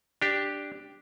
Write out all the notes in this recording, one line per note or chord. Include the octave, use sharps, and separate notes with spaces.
D4 G4